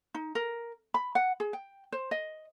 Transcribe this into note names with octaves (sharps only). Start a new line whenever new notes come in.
D#4
A#4
B5
F#5
G#4
G5
C5
D#5